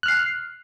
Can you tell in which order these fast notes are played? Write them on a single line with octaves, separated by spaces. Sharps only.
F#6 F6 C7